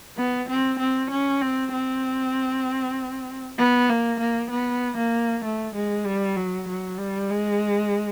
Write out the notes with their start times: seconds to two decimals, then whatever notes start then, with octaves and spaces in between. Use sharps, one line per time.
0.17 B3
0.49 C4
0.79 C4
1.10 C#4
1.41 C4
1.72 C4
3.59 B3
3.89 A#3
4.20 A#3
4.51 B3
4.97 A#3
5.44 A3
5.75 G#3
6.05 G3
6.36 F#3
6.68 F#3
6.99 G3
7.30 G#3